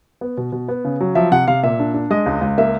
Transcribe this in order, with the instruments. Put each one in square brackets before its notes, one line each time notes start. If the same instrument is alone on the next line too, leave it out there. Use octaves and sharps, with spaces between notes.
[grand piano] B3
B2
B2
B3
C#3
F#3
F3 E5
C3 F#5
C3 F5
A#2 E5
D4
D4
G#3 D#5
C#2
C#2
A#3 E5